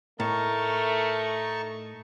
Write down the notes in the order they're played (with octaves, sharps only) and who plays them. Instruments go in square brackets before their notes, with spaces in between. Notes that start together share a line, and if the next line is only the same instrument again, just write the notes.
[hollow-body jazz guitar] A2 [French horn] A3 [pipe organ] D#4 A5 C#6 [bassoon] A#4